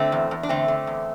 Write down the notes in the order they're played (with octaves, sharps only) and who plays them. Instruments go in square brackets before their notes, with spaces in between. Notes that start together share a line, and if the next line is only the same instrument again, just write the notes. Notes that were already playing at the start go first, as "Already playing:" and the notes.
Already playing: [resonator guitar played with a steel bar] D3 A3 C4
E2
E2
D4
D3 A3 C4
D3
E2